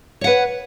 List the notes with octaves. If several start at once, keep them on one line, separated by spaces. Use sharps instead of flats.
B4 C#5 F#5